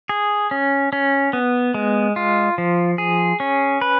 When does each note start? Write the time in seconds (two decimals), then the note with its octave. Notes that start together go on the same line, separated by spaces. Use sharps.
0.09 G#4
0.51 C#4
0.93 C#4
1.33 B3
1.74 G#3
2.16 F4
2.58 F3
2.98 G#4
3.40 C#4
3.81 B4